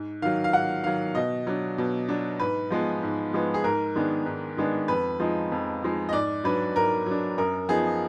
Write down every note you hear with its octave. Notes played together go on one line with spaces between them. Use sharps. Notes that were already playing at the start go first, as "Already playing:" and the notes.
Already playing: G#2
D#3 F#3 F5
F5
G#2 F#5
D#3 F#3 F5
B2 D#5
F#3 D4
B2
F#3 D4
G#2 B4
F3 G#3 B3
G#2
F3 G#3 B3
G#4
G#2 A#4
D#3 G#3 B3 D4
G#2
D#3 G#3 B3 D4
F2 B4
F3 G#3 D#4
F2
F3 G#3 D#4
D#5
G#2 D5
F#3 D4 B4
G#2 A#4
F#3 D4
F#2 A#4
F3 B3 D#4 G#4